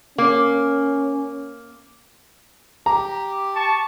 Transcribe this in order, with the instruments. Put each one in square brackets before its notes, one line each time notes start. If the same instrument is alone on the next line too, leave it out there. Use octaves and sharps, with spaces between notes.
[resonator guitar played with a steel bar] A#3 [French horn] C#4
[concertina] G4 [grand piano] A#5
[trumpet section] A5 C#6